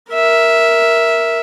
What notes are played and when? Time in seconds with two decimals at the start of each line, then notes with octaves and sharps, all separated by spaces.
0.13 A#4 E5